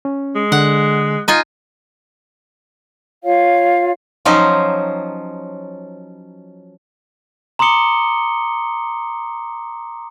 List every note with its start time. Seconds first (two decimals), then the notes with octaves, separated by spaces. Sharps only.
0.05 C#4
0.35 G#3
0.52 D3 F#5
1.28 D#4 F4 G#5
3.24 F4 C#5 F5
4.25 F3 F#3 C#4 D#4 C5
7.59 A#5 C6 D6 D#6 C#7 G7